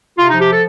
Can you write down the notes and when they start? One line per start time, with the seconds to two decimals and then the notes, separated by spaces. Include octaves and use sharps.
0.18 C3 F4
0.29 F3 D#4
0.41 G4
0.52 A4